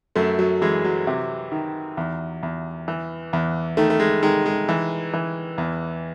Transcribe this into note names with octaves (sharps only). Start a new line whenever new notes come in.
F#2 A3
F#3
E3 G#3
F#3
C3
D#3
E2
E2
E3
E2
D#3 A3
A3
G#3
D#3 G#3
G#3
E3
E3
E2